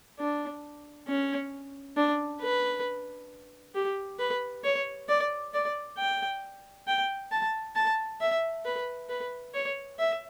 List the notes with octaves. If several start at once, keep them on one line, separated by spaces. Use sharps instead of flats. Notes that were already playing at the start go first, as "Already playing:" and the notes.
D4
C#4
D4
B4
G4
B4
C#5
D5
D5
G5
G5
A5
A5
E5
B4
B4
C#5
E5